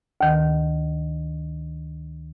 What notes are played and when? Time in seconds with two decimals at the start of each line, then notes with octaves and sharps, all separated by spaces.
0.21 D2 D#3